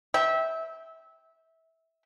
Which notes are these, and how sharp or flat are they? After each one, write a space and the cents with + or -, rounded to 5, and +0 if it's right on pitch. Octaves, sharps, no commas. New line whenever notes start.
E5 -20 G5 +0